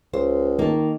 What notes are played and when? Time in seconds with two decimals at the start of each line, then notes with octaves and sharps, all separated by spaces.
0.14 C#2 C5
0.59 D#3 A#3 A5